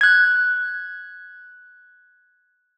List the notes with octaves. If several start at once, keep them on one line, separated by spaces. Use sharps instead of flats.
F#6 G#6